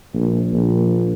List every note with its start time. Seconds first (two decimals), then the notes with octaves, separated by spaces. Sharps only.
0.14 A#1
0.53 A#1